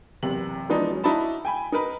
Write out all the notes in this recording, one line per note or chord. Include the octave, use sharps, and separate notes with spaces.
F#1 E2 C3 F#7
E3 F3 G#3 B3 D4 D#4
F#3 C#4
D#4 E4 F#4 D5 A5 B5
G5 G#5 B5
D#4 A#4 B4